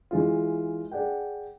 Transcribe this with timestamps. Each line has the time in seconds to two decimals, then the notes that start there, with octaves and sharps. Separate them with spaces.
0.11 E3 G#3 F4
0.91 G#4 D5 F#5 G5